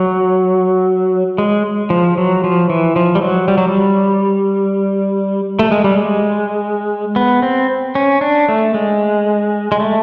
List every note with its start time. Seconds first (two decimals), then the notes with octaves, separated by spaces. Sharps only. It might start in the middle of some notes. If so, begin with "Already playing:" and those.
Already playing: F#3
1.38 G#3
1.90 F3
2.18 F#3
2.44 F3
2.69 E3
2.96 F3
3.15 G3
3.22 F#3
3.48 G3
3.58 F#3
3.68 G3
5.59 A3
5.71 G#3
5.84 G3
5.97 G#3
7.16 B3
7.42 C4
7.95 C#4
8.21 D4
8.49 A3
8.74 G#3
9.72 G#3
9.80 A3